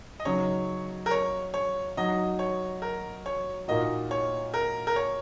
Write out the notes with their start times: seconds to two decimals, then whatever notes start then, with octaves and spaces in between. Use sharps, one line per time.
0.20 D#5
0.25 C#3 F#3 D#4 C#5
1.06 A#4
1.11 C#5
1.54 C#5
1.97 F#3 D#4 F#4 D#5
2.39 C#5
2.82 A#4
3.26 C#5
3.68 A#2 A#3 D#4 F#4 D#5
4.11 C#5
4.54 A#4
4.87 A#4
4.96 C#5